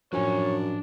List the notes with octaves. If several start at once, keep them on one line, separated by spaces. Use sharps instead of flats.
F#2 A2 F3 D4 C#5 G#5